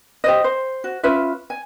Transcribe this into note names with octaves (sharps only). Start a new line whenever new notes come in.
G4 C5 D#5
C5
F#4
C#4 F4 B4 E5
G#5